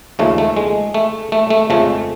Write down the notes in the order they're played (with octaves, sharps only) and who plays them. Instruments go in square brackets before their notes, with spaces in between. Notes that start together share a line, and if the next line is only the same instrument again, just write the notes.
[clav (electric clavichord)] D#2 C#3 F3 G#3 A3
A3
G#3
A3
A3
A3
F2 C#3 F3 G#3 A3